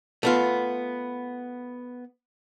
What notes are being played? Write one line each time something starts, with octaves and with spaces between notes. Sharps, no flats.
A3 B3 F4